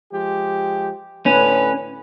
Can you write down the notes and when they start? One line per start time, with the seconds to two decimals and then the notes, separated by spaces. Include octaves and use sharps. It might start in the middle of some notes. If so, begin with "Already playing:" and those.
0.13 F3 G#3 G4
1.26 A2 D3 C#4 B4